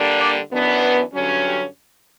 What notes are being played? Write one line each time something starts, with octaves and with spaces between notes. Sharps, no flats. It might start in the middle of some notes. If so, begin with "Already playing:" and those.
Already playing: D3 G3 A#3 D4
D5
F#2 E3 B3 D4
B4
G2 D3 F#3 C#4
G4